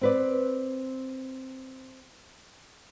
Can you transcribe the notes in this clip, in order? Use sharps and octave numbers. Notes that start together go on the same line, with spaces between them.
C4 B4 D5